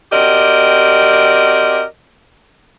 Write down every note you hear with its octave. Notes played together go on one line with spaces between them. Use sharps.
C4 F#4 G4 A#4 D5 D#5